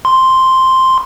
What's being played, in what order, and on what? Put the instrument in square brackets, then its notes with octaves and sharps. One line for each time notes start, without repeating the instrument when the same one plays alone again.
[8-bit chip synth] C6